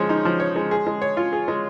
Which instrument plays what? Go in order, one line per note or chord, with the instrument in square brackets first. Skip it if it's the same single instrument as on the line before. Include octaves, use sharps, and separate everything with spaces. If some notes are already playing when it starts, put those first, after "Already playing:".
Already playing: [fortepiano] F3 G#3 C#5
D#4
F3
C#5
G#3
G#4
G#3
C#5
F4
G#4
G#3